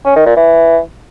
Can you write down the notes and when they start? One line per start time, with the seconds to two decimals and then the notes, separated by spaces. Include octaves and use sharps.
0.05 C#4
0.16 D#3
0.26 A#2
0.36 E3